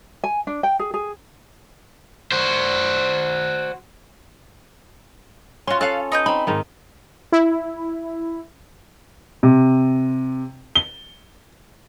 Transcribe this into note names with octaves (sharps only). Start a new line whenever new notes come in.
G#5
D4
G5
G#4
G#4
F#4 C5
C#4 F4 F#4 C6
C#4 A4 F5 F#6
D#4 B4 G6
C4 D#4 B5
G#2 D#3 D#4
E4
C3
G7